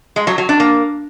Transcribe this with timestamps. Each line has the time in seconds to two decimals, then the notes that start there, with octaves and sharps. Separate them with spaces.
0.16 G#3
0.27 F#3
0.38 F#3
0.49 D4
0.60 A#3